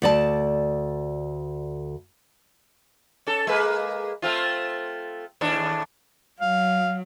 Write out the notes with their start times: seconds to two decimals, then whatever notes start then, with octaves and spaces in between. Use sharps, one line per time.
0.02 D2 D5 A5
3.27 C#4 A4
3.47 G#3 A#3 B4
4.22 A3 C4 F4
5.41 D#2 A2 D4
6.40 F#3 F5